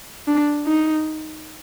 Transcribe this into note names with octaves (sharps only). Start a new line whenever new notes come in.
D4
D#4